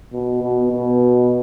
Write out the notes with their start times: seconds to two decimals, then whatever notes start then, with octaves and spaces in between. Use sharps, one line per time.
0.13 B2
0.43 B2
0.71 B2